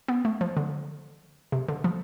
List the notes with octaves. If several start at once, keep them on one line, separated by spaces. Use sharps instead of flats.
B3
A3
F3
D3
C3
D3
F3